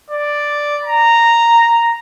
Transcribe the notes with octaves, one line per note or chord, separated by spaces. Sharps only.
D5
A#5